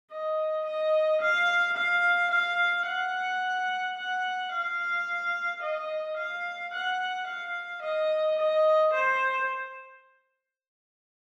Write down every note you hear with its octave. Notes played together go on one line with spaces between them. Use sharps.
D#5
D#5
F5
F5
F5
F#5
F#5
F5
D#5
F5
F#5
F5
D#5
D#5
C5